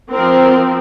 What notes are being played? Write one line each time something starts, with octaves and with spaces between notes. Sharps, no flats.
F3 C4 A#4